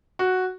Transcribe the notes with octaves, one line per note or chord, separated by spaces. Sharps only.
F#4